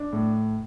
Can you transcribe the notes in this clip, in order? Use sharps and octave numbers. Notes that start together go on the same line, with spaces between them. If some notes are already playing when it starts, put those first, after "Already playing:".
Already playing: D4
A2